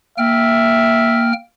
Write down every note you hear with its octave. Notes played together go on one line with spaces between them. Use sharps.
A#3 E5 G5 F6